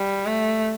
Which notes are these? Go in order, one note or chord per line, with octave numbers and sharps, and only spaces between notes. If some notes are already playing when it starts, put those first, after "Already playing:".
Already playing: G3
A3